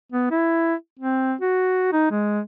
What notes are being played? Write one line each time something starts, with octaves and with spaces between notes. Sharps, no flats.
B3
E4
C4
F#4
D#4
G#3